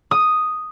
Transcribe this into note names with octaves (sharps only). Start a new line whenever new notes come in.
D#6